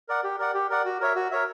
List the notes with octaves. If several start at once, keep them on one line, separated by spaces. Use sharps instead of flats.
A#4 D5 F#5
G4
A#4 D5 F#5
G4
A#4 D5 F#5
F#4
A#4 C#5 E5
F#4
A#4 C#5 E5